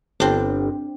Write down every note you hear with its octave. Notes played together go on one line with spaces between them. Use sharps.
G1 C4 D4